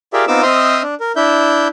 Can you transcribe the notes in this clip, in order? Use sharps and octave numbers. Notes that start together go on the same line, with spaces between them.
F4 G4 G#4 A#4 D5 E5
B3 C4 D#4 F4 D6 E6
C4 C5 D#5 E5 D#6 F6
D4
A#4
D4 E4 E5 G6